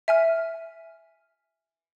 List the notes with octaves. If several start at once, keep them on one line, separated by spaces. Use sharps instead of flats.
E5 G#5 F6